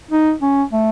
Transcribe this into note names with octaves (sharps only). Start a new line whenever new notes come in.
D#4
C#4
A3